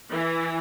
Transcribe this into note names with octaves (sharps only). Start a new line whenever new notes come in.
E3